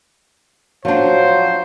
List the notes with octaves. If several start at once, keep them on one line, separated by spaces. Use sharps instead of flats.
F3 F#3 D4 C5